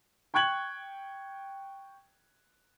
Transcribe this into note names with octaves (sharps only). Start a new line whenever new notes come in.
G5 C#6 F#6 G#6 F#7